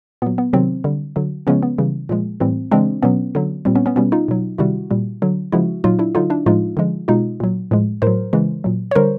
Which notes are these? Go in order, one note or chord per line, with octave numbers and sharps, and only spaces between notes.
A#2 F#3 B3
B3
C3 D#3 F#3 C4
D3 G3
D3 F#3
C#3 F3 G#3 B3 C#4
B3
C#3 E3 G3
A#2 F3 G#3
A2 E3 G3 C4
C#3 E3 G#3 C4 D4
B2 F#3 B3 C#4
D3 F#3
A#2 G3 C4
B3 C#4
B3 C#4
B2 G3 B3 C#4
D#4 F4
B2 F#3
C3 D#3 G3 E4 F#4
A#2 G3
D3 F#3
C#3 F3 G#3 E4 F#4
A#2 F#3 D#4 F4
D4 E4
D3 F#3 D#4 F4
D4 E4
A2 F3 G#3 D#4 F4
D3 F3 G#3
B2 G#3 D#4 F4
A#2 F#3
A2 F3 G#3
A2 F#3 A#4 C5
C#3 E3 G#3
A#2 F#3
C#5
D3 G3 A#4 C5